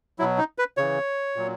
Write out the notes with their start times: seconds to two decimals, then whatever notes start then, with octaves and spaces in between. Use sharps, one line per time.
0.19 F#3 E4
0.22 B2
0.38 D#4
0.58 B4
0.77 C#3 E3 C#5
1.36 A#2 F#3